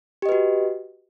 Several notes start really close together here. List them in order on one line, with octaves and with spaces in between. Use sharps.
G4 D#5 B4 F#4